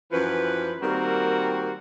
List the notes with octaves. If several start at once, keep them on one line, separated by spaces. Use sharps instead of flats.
F#2 E3 F3 B4
D#3 G3 A#3 C4 F#4 A#4